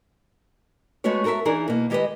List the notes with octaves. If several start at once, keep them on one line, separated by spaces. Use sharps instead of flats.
G#3 A3 B3 F#4 C#5
F#4 A4 A#4 D5 E5
E3 D4 D#4 G#4 A#4
B2 A#3
D#3 G#3 G4 A4 B4 D#5